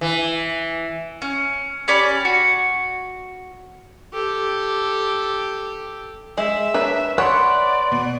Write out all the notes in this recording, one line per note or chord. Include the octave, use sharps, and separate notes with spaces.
E3
C#4
C#4 G4 D5 B5
F#4
G4 A4
G#3 E5
D4 A#4 B4 C#5
B4 C#5 D5 F#5 B5 C6
B2